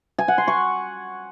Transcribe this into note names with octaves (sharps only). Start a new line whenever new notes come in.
G#5
F#5
C6
C#6